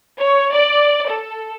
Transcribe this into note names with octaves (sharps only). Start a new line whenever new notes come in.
C#5
D5
A4